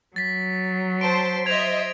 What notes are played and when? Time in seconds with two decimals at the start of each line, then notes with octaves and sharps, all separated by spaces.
0.16 F#3 A6 B6
1.01 C5 A5 C6 D7
1.46 C5 D#5 E5 G#6 F7